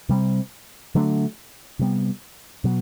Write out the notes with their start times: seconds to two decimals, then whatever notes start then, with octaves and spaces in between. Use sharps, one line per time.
0.09 C3 G3 C4
0.95 D3 F#3 A3 D4
1.79 C3 G3 B3
2.64 B2 F#3 B3